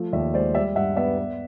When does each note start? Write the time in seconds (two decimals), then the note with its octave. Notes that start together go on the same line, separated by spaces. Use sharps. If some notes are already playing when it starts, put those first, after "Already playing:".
Already playing: F3 A3
0.13 D#2 D5 E5
0.34 G#3 C5 D5
0.54 G3 D5 E5
0.75 G2 E5 F#5
0.96 B3 D5 E5
1.17 B3